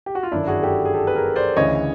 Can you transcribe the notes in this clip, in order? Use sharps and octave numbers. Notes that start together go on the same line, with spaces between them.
G4
F#4
F4
G1 F#2 D#3 D4 E4
F#4 G#4
G4 A4
G#4
G4 A4
B4
G#4 A#4
C5 D5
D2 C#3 E3 C#5 D#5